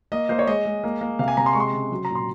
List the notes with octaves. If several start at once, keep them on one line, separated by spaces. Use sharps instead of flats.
A#3 D#5
A#3 C5
C#5
G#3 D#5
G#3
A#3
A#3
C3 F5
G#5
C3 A#5
C6
G#3 C#6
C6
C#3
F#3
A#2 A#5
C6